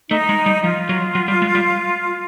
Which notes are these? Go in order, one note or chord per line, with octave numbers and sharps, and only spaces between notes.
A3 D#4
G#3
G3
F3 F4
F#3
F#3
G3
G#3
G3